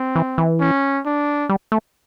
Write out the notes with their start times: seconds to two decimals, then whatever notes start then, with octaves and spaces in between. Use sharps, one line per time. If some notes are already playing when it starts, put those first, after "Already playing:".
Already playing: C4
0.16 E3
0.38 E3
0.61 C#4
1.05 D4
1.49 G3
1.72 A3